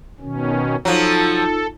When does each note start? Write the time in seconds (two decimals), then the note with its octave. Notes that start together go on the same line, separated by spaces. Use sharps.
0.20 B2 D#3 C#4
0.85 F3 F#3 D#4 F4 A4